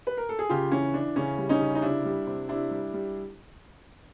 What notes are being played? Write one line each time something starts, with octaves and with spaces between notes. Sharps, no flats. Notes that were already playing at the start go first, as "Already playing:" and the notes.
B4
A#4
A4
G#4
C#3 F4 G4
E3 C#4
E3 D4
C#3 C#4
G3
C#4 D#4
C#3
D#4
C3 D4 E4
G3
C3
C3 D4 E4
G3
G3